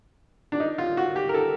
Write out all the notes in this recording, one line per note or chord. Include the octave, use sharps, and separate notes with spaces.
D4
D#4
F4
F#4
G4
A#4
A4